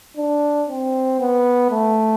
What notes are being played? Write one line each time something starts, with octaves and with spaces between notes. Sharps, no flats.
D4
C4
B3
A3